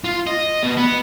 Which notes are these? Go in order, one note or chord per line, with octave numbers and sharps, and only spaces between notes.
F4
D#5
B2
B3